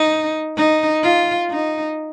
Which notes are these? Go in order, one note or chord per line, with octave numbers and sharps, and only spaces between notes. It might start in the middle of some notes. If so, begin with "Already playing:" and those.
Already playing: D#4
D#4
F4
D#4